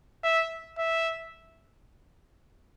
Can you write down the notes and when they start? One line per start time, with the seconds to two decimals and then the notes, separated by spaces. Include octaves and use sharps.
0.24 E5
0.78 E5